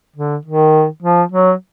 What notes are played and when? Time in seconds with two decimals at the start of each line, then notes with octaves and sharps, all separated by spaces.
0.16 D3
0.45 D#3
1.03 F3
1.32 F#3